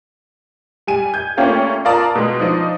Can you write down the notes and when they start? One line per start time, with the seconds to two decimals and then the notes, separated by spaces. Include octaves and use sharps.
0.87 G3 G#5 D#7
1.14 G6 G#6
1.37 A3 A#3 C#4 D4 F4 G4
1.85 F4 A#4 D5 A5 A#5 D#6
2.15 B2 G#3
2.40 F3 D4 D#4